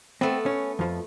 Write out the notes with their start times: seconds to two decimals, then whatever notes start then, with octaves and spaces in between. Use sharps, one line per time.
0.21 A3 B3 C4
0.46 C#4
0.79 F2 F3